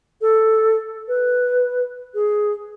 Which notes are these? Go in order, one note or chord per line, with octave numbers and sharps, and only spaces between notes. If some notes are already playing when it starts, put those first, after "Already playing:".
A4
B4
G#4